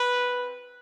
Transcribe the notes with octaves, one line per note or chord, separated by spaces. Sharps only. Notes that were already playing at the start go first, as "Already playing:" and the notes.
Already playing: B4
C4 F4